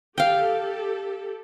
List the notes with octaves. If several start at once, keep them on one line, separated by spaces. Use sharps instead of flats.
G4 A4 F5 G5